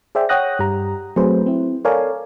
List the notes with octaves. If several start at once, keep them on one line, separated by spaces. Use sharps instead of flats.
G#4 C5 D5 E5 G5
C#5 F#5 G5 D#6 F#6 A#6
G2 G4 A#5
F#3 A3 C4 G#4 B4 C5
C4 E4
A4 A#4 C#5 D5 F5 G#5